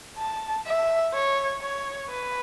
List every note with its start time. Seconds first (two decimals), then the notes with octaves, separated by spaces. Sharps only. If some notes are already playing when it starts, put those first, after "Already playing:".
0.18 A5
0.66 E5
1.13 C#5
1.62 C#5
2.10 B4